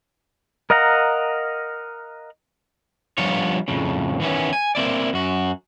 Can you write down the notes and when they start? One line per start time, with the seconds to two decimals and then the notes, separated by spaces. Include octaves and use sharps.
0.70 A#4 D#5 F5 F#5 A#5
3.18 F3 G3 B3 D4 F4 C#5
3.68 F2 A2 C#3
4.20 D#3 E3 B3 C#4
4.53 G#5
4.75 A#3 C4 E4 D5
5.13 F#2 F#4